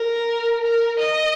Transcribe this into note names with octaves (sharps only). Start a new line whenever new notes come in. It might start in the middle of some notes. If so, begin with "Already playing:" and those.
Already playing: A#4
A#4
D#5